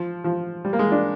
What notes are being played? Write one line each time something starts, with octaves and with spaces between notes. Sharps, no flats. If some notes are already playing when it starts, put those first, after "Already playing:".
Already playing: F3
F3
G3
A#3
G#3
D4